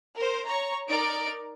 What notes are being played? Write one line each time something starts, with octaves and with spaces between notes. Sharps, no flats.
A#4 C5
C#5 A#5 C#6
D#4 A#4 D5 D7